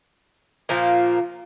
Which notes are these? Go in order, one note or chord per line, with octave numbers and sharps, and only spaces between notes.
A#2 F3 A#3